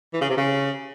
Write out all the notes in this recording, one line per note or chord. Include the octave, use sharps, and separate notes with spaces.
E3
C#3
C3
C#3